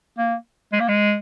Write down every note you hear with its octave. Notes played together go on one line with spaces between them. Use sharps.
A#3
G#3
A#3
G#3